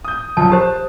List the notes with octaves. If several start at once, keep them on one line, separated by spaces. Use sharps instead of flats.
D#6 G6
A#1 F#2 F3 A5
G4 C5 A5